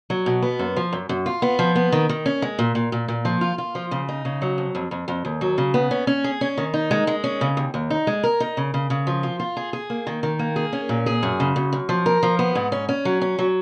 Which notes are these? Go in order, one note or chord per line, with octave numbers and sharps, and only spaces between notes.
F#3
B2
B3
F#2
F3
F#2
F#2
F4
B3
F3
B3
D#3
D#3
C#4
G#3
A#2
A#2
A#2
A#2
F3
F4
F4
F3
C#3
D#4
C#3
F#3
F2
F2
F2
F2
D#2
F#3
C#3
B3
C#4
C#4
G#4
C#4
D#3
D#4
G#3
G#3
C#4
C#3
D#2
D#2
D#4
G#3
A#4
D#4
C#3
C#3
C#3
F3
F4
F4
G#4
G#4
A#3
D#3
D#3
A#3
G#4
C#4
A#2
G#4
F#2
C#3
F#2
F#2
F3
A#4
F3
B3
G#2
C#4
C#4
F#3
C#4
F#3